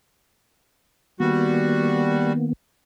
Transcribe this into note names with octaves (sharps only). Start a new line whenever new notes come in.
D#3 G3 A#3 B3 F#4